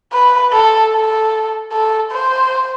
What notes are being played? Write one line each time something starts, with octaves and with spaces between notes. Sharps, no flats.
B4
A4
A4
A4
C5